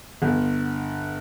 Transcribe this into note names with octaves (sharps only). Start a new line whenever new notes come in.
G1